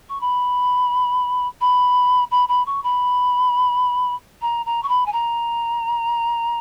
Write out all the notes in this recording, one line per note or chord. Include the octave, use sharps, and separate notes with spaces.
C#6
B5
B5
B5
B5
C#6
B5
A#5
A#5
C#6
B5
G#5
A#5